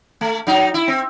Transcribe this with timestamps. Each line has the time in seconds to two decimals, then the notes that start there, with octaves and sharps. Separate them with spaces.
0.21 A3
0.47 F#3 D#4
0.74 E4
0.88 C4